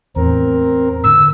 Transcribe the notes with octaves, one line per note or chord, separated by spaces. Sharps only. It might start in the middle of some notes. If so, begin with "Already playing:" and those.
E2 A2 C4 A#4
G#2 D3 E6